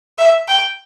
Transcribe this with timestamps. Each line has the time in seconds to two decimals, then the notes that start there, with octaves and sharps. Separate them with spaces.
0.18 E5
0.48 G5